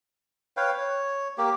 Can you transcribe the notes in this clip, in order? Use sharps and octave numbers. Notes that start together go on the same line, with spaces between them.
B4 C#5 F5 G5
C#5
A#3 G4